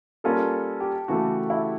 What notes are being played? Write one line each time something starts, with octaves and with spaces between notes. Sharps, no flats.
G3 A#3 C#4 F4 A4
G4
C#3 E3 A3 F#4
E4